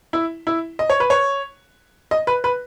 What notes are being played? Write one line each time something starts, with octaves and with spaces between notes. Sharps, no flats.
E4
E4
D#5
C#5
B4
C#5
D#5
B4
B4